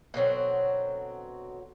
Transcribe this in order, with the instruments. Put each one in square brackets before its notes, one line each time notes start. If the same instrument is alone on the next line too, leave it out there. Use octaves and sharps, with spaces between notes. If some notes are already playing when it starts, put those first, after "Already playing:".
[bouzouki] B2 D3 F#3 C4